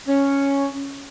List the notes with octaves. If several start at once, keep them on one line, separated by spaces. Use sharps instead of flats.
C#4